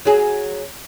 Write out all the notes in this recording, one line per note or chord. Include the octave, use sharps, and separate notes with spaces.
F#3 G#4